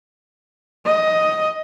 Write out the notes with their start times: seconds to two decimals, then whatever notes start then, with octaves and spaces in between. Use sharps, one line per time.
0.86 D#5